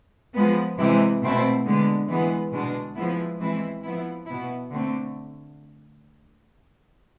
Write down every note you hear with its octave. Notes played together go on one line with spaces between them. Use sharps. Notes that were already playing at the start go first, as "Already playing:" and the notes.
F3 G#3 B3
C3 E3 G#3 C4 E4
B2 A3 C4 E4
D3 G#3 B3
E3 G#3 B3
B2 G#3 D4
F3 G#3 B3 E4
E3 G#3 C4 E4
F3 B3 E4
B2 B3 E4
D3 A3 C4